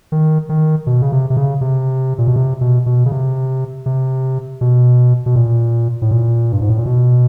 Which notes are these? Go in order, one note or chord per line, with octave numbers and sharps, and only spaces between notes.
D#3
D#3
B2
C#3
C3
C3
C#3
C3
A#2
B2
C3
B2
B2
C#3
C3
C3
B2
B2
A#2
A2
A#2
G2
G#2
A2
A#2
B2